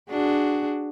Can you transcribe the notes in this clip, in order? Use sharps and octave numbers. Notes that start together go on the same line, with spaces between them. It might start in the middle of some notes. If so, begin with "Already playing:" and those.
D4 F#4 G#4